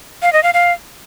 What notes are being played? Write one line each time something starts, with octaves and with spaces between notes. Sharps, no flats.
F5
D#5
F5
F5